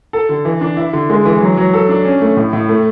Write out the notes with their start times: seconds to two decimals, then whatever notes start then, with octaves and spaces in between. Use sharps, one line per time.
0.13 A4
0.29 D3
0.45 E3
0.61 D4
0.77 E4
0.93 D3
1.10 G#3
1.25 E3
1.41 F#3
1.57 F#3
1.73 A4
1.89 D4
2.05 C#4
2.21 A3
2.37 A2
2.53 A2
2.69 A3